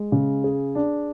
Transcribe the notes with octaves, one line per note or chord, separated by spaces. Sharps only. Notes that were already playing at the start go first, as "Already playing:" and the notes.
Already playing: G#3
C#3
G#4
D4